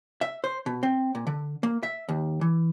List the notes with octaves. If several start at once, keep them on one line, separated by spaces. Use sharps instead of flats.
E5
C5
B2
C4
A#2
D3
A#3
E5
D#2
E3